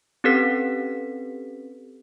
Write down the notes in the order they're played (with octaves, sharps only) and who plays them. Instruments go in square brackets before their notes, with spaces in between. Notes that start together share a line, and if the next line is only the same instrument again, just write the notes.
[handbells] C4 C#4 G4 A4 B4 B6